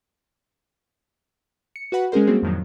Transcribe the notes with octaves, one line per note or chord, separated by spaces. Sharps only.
C#7
F#4 B4 F#5 B5
G#3 C#4 G#4 A#4 C5
G3 A#3 C4 F#4 G#4
F2 A2 D#3 F3 F#3